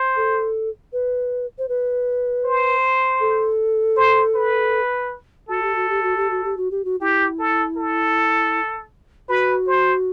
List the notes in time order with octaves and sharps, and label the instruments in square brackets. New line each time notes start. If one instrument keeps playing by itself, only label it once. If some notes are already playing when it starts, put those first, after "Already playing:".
Already playing: [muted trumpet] C5
[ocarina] A4
B4
C5
B4
[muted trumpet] C5
[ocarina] A4
[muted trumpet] C5
B4
[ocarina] F#4 [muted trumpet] A4
[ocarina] G4
F#4
G4
F#4
G4
F#4
G4
F#4
G4
F#4
[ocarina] E4 [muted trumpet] G4
[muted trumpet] A4
A4
[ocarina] F#4 [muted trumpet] B4
[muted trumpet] C5